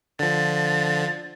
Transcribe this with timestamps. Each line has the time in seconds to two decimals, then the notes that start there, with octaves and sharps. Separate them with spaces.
0.19 D3 F3 A6